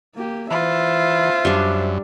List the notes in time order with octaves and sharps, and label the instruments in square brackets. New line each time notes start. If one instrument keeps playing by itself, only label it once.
[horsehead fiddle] A#3 G4
[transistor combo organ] E3 [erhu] F4 [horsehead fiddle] C5 E5
[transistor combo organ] F#2 [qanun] G3 D4